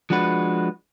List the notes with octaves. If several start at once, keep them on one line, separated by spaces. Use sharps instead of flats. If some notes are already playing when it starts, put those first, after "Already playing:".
F3 G#3 D4 F#4 B4